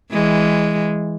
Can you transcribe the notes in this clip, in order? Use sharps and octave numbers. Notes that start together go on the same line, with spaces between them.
E3 G#3